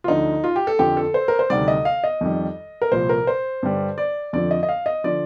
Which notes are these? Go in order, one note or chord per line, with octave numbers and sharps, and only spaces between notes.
F4
D2 D3 F3 D#4
F4
G4
A4
F2 D3 F3 G4
A4
C5
A#4
C5
D2 C3 D#3 G3 D5
D#5
F5
D#5
F2 D#3 G3
A#4
C2 A#2 F3 C5
A#4
C5
G2 D3 G3
D5
F2 D3 F3 D5
D#5
D#5
F5
D#5
D3 F3 D5